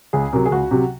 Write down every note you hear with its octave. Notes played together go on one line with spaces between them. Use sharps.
C#2 G#4
C3 F#3 A#4
G#4
C#2 F#4
C3 F#3